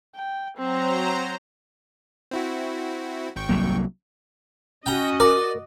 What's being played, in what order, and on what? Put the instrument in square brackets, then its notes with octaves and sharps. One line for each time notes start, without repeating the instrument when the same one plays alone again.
[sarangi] G5
[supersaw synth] F#3 C5 A#5 [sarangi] C4
[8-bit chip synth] C4 E4 F#4
G#1 G5 C#6
[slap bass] C2 F#3 A#3
[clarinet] C#4 [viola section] F#4 D#5 [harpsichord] G5 A#5
[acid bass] A#4 [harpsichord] D5